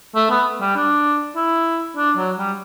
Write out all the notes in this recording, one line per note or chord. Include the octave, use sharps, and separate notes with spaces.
A3
B3
G3
D4
E4
D4
F#3
G3